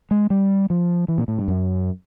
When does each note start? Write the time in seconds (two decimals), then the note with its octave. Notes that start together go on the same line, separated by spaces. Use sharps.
0.11 G#3
0.30 G3
0.70 F3
1.08 E3
1.18 A#2
1.28 A2
1.39 G2
1.48 F#2